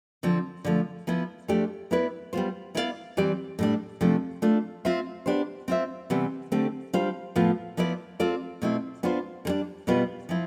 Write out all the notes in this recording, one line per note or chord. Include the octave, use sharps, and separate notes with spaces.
D3 F3 C4
D3 F3 A3
F3 B3 E4
F3 A3 D4 G4 D5
B3 E4 B4 D5
G3 B3 F4 C5
B3 E4 G4 D5 F5
E3 G3 C4 G4 D5
A2 G3 D4
C3 F3 A3 D4
A3 D4 F4
C4 F4 C5 E5
B3 D4 G4 C5
C4 F4 C5 E5
C3 E3 G3 B3
D3 A3 C4 G4
G3 D4 F4 C5 F5
A2 F3 B3 F4
F3 B3 E4 B4 D5
C4 F4 A4 D5
B2 A3 C4 E4
B3 D4 F4 C5
D3 G3 D4
B2 G3 B3 F4 B4
F3 C4 E4